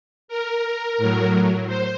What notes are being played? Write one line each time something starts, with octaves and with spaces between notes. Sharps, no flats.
A#4
A2 F#3
C5